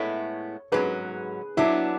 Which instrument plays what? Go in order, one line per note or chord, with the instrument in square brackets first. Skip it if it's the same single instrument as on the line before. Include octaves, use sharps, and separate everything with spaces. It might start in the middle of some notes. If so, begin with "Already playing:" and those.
Already playing: [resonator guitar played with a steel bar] A2 G#3 B3 E4 [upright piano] A4 C#5
[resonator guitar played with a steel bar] G#2 F#3 C#4 [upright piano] G#4 B4
[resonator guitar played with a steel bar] F#3 B3 D4 [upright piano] E4